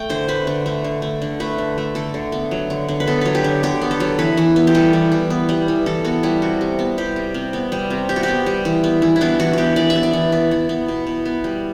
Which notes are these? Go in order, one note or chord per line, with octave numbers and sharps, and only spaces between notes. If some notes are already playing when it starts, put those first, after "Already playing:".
Already playing: A3 G5
D3 C5
A3 B4
D3
A3
D3
A3
D3
A3 B4
D3
A3
D3 A4
D3
B3
F#3
D3
D3
B4
B3 A4
F#3 B4
G4
D3
D3 G4
B3
A4
F#3
E3 B4
E3
B3
G4
G3 A4
E3
E3
B3
G3
E3
E3 A4
B3 F#4
G3 E4
C3 F#4
C3
B3
G3 G4
C3
C3
B3
G3
C3
C3 G4
F#4
G4
B3
G3
E3
B3
E3
E4
B3 D4
E3 F#4
B3 F#4 G4
E3 D5
E5
B3
D5
E3
B3
E3
B3
B2
B2
B3
G3